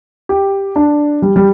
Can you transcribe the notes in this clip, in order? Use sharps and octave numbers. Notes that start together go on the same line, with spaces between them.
G4
D4
G3
G3